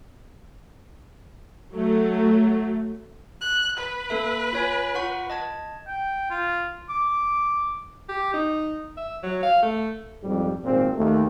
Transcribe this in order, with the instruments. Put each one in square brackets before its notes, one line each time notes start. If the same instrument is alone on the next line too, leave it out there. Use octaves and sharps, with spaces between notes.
[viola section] F#3 A3
[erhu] F#6
B4
[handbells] A#3 A4 E5
F4 C#5 G#5
F4 F#5 C#6
D#5 A5 G#6
[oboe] G5
F4
D6
[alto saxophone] G4
D#4
E5
F#3
F5
A3
[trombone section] F2 G#2 G3
G#1 A#2 C4
D#2 A3